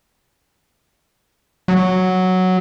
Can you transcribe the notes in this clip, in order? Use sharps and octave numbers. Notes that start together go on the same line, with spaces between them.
F#3